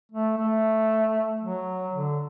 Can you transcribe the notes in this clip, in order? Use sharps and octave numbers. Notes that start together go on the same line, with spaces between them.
A3
A3
F#3
D3